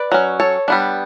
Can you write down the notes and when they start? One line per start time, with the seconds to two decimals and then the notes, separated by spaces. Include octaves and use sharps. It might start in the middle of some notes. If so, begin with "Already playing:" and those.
Already playing: B4 D5
0.12 F#3 C#4
0.40 A4 C#5
0.68 G3 B3 D4